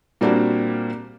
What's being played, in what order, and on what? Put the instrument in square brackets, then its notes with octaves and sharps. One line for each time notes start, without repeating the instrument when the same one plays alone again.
[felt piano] A#2 G3 A#3 C4 D4 F#4